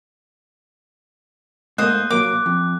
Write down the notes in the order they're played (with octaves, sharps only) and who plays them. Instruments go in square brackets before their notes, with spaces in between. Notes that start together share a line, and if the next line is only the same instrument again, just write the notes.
[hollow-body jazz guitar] G#2 A3 A#3 [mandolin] C5 D#5 [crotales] F#6
[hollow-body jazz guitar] A#2 F#3 A#3 [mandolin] D6
[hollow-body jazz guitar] F2